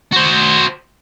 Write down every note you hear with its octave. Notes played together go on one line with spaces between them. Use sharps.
F#4 C5